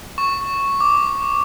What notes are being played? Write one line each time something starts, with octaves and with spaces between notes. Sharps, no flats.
C#6
D6